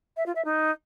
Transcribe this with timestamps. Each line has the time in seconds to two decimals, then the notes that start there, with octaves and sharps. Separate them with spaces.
0.17 E5
0.26 F4
0.35 E5
0.45 D#4